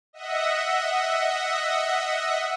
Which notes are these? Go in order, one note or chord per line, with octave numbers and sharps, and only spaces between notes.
D#5 E5 F#5